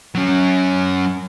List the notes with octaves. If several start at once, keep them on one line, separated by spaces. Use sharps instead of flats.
F#3 C#4